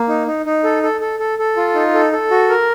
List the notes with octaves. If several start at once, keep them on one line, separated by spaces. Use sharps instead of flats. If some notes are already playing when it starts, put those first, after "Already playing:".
Already playing: A#3
D#4
D#4
D#4
A4
A4
A4
A4
A4
F4
D#4
A4
A4
F#4
A#4